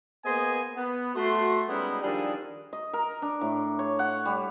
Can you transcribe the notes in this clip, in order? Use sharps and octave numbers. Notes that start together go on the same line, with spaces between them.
A#3 B3 G#4 C5 D#5 G#5
B3
A3 F#4 C6
G3 G#3 B3 C#4 D#4 E4
D#3 F3 G3 D4 G#4 A4
D#5
A#4
D4
A2
C#5
F#5
G3